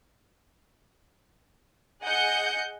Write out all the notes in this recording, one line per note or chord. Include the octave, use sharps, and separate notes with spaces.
G#4 D#5 F#5 G6 C#7